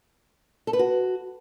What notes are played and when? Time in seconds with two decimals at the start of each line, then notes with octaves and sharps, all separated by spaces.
0.67 A4
0.73 B4
0.79 F#4